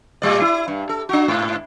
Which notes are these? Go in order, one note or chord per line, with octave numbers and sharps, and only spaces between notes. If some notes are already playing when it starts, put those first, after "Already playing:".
A2 G3 D5
E4
G2
A4
D4 F#4
G#2